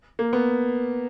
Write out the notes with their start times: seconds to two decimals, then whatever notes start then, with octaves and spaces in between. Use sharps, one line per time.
0.19 A#3
0.33 B3